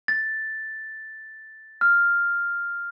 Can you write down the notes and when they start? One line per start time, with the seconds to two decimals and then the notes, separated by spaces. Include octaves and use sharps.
0.08 A6
1.81 F6